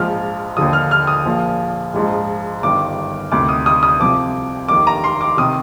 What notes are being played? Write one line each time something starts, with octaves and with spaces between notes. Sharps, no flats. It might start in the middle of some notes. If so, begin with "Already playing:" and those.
Already playing: A#1 G#2 F3 F6
D#2 D3 F3 D#6
F6
F6
D#6
A#1 A#2 F3
A#1 G#2 F3
G1 G2 D#3 D6
D2 C3 D#3 D6
D#6
D#6
D#6
C2 C3 F3 D6
F1 D#2 D#3 D6
A#5
C6
D6
C3 D#3 D#6